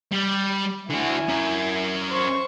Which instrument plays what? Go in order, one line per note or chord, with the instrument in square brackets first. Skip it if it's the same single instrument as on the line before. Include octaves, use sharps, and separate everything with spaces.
[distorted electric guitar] G3
[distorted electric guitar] D3 F#4 [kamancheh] E4 G#5
[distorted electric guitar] C#4 A#4
[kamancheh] C5 C#6